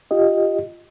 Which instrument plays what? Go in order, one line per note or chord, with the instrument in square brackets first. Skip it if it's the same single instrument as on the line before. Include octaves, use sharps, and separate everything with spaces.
[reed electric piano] F4 G4 D#5